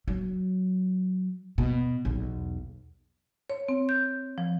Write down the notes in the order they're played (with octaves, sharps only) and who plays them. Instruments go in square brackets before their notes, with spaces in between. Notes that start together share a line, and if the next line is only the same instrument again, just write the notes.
[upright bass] F#3
B2
B1 E2
[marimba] C#5
C4
G6
F3